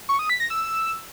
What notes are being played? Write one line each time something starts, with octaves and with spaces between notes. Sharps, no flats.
C#6
D#6
B6
A#6
E6